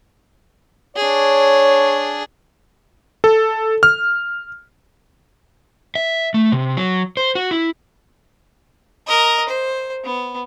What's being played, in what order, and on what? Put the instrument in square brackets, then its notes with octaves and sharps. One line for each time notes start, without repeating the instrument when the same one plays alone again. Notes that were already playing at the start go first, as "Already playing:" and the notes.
[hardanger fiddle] D4 G#4 [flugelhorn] C#5
[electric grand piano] A4
F6
[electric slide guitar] E5
A3
C3
F#3
C5
F#4
E4
[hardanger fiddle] A#4 D#5
C5
B3